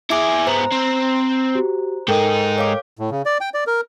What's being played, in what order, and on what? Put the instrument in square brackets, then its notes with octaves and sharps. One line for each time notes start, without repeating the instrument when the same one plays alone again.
[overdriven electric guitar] E4 G#4 [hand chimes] E5 D6 D7
[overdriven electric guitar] G#2 B3 [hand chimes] C5 A#5
[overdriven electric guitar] C4
[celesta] F#4 G4
[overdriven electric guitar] G#2 D#4 [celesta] A4 A#4 G5
[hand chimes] C#5 F5 D6
[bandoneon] A2
C#3
D5
G5
D5
A#4